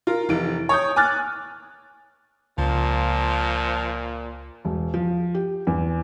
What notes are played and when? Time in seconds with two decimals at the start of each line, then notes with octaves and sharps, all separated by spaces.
0.07 F4 A#4
0.29 F1 E3 D7
0.69 C#5 D#6 G6
0.96 G#5 D6 F6 F#6 A6
2.58 C#2 A#2 F3
4.65 E1
4.94 F3
5.35 G4
5.67 E2